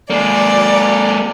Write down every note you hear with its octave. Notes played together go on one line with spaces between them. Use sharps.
G#3 A#3 D5